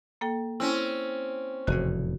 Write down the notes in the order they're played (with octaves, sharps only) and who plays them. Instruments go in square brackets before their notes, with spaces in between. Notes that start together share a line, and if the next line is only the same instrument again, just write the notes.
[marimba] A#3 A4 G5
[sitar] C4 C#4 [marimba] E4
[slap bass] F1 E2 A2 [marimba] C#3 F#4